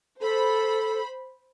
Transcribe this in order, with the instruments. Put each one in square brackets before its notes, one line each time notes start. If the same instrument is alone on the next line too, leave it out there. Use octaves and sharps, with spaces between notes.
[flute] A4 [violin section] C5 B5